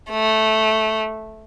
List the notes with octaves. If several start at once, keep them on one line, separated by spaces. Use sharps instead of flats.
A3